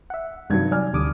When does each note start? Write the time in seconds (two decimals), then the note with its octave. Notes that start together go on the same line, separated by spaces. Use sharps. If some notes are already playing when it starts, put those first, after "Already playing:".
0.10 E5 F#5
0.50 G2 C3 D#3 F#3 G#6
0.71 D5 G#5 F6
0.93 D2 D3 G3 D6 D#6